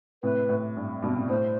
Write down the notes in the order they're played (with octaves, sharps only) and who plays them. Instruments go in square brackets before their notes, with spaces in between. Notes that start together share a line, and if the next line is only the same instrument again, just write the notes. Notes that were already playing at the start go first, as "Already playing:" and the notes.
[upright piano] A2 C3 [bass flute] B4
[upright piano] A2
G2
G2 B2
A2 C3
[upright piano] A2 [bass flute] C5